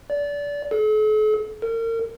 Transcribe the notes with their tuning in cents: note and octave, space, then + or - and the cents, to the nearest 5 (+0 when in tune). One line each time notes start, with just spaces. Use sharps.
D5 -25
A4 -45
A#4 -35